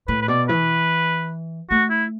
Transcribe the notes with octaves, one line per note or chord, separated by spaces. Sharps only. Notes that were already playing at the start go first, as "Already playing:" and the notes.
A2 B4
B4
B2 D5
E3 B4
A3 F#4
E4